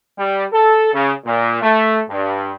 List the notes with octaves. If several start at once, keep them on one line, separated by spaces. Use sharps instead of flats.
G3
A4
C#3
A#2
A3
G2